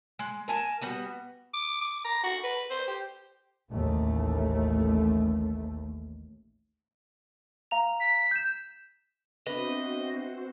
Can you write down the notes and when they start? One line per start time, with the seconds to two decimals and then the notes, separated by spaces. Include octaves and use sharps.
0.19 G#3
0.48 A#4 G#5 A5
0.81 G3 B3 F#4
1.54 D6
1.82 D6
2.05 A#5
2.24 F#4
2.44 B4
2.71 C5
2.88 G4
3.73 A1 D#2 A3
7.71 F5 A#5 F7
8.00 B6
8.31 G6 E7
9.47 B3 C4 D4 F#4 B4 C5 D#5 E5